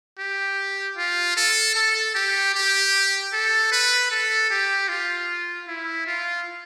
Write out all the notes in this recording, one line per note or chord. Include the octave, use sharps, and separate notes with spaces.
G4
F4
A4
A4
G4
G4
A4
B4
A4
G4
F4
E4
F4